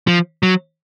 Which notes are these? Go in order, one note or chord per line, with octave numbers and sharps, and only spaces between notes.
F3
F#3